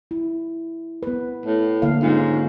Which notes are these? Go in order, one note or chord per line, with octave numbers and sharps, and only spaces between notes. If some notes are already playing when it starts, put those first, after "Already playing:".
E4
B3 B4
A2
D3 A#3 F5
G#2 G#3 C#4 F4